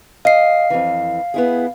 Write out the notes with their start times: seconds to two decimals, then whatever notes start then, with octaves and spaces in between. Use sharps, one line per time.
0.25 D#5 F5 C7
0.70 F2 E3
1.34 B3 E4 G#4